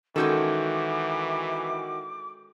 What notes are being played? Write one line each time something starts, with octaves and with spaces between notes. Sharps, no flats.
D#3 E3 G#3 C#4 F#4 A4 D6 G6